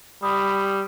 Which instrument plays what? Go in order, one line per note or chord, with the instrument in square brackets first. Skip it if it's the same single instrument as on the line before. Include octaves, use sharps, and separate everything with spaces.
[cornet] G3 [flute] B5 [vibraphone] D#6